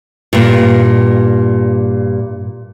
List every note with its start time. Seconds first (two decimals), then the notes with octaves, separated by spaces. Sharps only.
0.33 G2 A#2